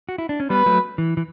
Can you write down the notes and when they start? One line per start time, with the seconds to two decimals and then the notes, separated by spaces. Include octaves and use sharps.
0.09 F#4
0.18 E4
0.29 D4
0.40 C#4
0.50 G3 B3 B4
0.66 F#3 A3
0.98 E3
1.17 E3